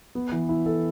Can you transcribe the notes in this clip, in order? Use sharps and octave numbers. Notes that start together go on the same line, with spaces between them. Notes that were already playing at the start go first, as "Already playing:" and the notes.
B3
E3
E4
A4